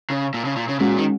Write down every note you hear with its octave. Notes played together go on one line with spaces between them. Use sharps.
C#3
A#2
C#3
A#2
C#3
A#2 G#3 C#4 F#4
D#3